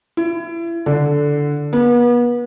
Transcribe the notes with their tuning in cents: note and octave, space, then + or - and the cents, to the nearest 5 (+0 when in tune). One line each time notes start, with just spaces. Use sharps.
E4 +30
D3 -5
B3 -35